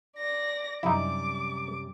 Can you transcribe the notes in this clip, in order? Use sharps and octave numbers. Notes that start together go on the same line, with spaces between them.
D5 A#6
F#2 C3 G3 D#4 E4 D6